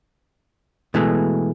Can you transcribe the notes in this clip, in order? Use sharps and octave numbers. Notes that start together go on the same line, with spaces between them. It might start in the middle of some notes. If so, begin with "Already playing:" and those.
B2 E3 G#3 A3